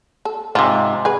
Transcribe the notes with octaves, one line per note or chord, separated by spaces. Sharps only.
A4
G#2 C3 F4
G#4 B4